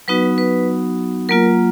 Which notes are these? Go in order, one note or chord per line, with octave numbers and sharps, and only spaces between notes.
F#3 B3 D#4 F#4 B4
B4
F#3 A#3 F4 A#4